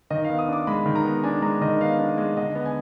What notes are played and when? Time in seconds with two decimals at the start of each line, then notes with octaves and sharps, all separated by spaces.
0.10 D#3 D#5
0.24 F5
0.29 B3
0.39 D#6
0.48 D4 D6
0.67 G#3 B5
0.86 D#3
0.95 A#5
1.04 B3
1.24 D4 G#5
1.42 G#3 A#5
1.61 D#3 D#5
1.81 B3 F5
1.99 D4
2.18 G#3
2.37 D3 D#5
2.55 B3
2.65 G#5